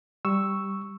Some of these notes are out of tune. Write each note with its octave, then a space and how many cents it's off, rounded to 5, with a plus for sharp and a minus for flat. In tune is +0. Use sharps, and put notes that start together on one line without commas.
G3 +0 C#6 +0 E6 +0